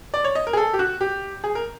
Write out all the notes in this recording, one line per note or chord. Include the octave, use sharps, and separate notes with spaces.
D5
C#5
D#5
A#4
G#4
A4
G4
F#4
G4
G#4
A#4